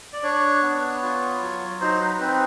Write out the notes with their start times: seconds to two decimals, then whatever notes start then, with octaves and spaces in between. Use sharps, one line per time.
0.13 D5
0.23 D4 C#5
0.63 B3
1.02 F4
1.42 F#3
1.81 D#4 C5
2.01 B4
2.21 C4 B4